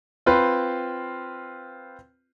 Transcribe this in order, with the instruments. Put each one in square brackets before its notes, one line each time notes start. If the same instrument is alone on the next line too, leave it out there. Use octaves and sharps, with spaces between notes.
[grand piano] C4 F4 B4